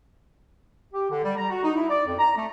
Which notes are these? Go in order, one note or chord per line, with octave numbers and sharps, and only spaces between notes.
G4
D3
G3
A#5
F#4
D#4
E4
D5
F2
A#5
A3